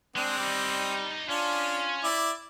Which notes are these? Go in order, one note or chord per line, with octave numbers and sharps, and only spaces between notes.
G#3 C4 D4
G3 D#4 D5
C#4 D4 F4
E4 D5